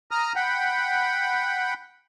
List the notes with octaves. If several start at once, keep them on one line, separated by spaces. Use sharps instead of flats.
A#5 D#6 F6
F#5 G5 B5